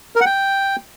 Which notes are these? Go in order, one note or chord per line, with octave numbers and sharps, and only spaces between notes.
A#4
F#5
G5